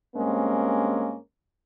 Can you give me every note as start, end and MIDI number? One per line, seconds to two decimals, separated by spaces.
0.16 1.17 43
0.16 1.17 56
0.16 1.17 58
0.16 1.17 60
0.16 1.17 61